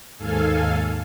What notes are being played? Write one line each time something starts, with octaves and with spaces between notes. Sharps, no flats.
D#2 G#2 A4 F5 G#5